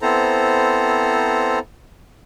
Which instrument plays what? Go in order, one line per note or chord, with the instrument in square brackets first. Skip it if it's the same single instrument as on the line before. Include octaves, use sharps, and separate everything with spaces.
[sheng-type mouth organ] B3 C4 E4 A4 C5 A#5